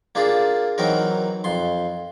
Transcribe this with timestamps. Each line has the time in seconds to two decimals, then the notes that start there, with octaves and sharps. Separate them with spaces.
0.15 A#3 D4 F4 G#4
0.78 E3 F#3 C4 D#4 A#4
1.44 F2 C6